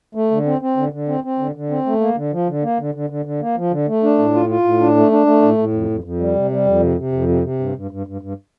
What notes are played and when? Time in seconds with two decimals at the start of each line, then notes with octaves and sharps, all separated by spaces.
0.15 A3
0.31 D3
0.46 C4
0.61 C4
0.77 D3
0.92 D3
1.08 C4
1.24 C4
1.39 D3
1.55 D3
1.70 C4
1.86 A3
2.01 A#3
2.16 D3
2.33 F3
2.48 D3
2.63 A#3
2.79 D3
2.94 D3
3.10 D3
3.25 D3
3.41 A#3
3.57 F3
3.72 D3
3.88 A3
4.03 D4
4.19 A2
4.34 F4
4.49 F4
4.65 A2
4.80 D4
4.96 A3
5.11 D4
5.26 A3
5.42 A2
5.58 A2
5.73 F2
5.90 F2
6.04 F2
6.20 G3
6.35 C3
6.51 G3
6.66 F2
6.82 C3
6.97 C3
7.12 F2
7.28 C3
7.43 C3
7.60 G2
7.76 G2
7.91 G2
8.07 G2
8.21 G2